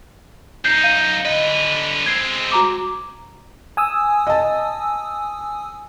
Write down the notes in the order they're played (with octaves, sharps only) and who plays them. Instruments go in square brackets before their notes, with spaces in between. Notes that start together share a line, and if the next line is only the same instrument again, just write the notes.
[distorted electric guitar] F#2 D#4 [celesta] G6 C7
[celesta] F5 G6 D#7
[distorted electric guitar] D3 B4 [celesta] D#5
[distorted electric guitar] G#3 C4 [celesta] G#6 C7
[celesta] F#4 A#5 D6
[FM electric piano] G#5 D#6 E6
[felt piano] D#5 A5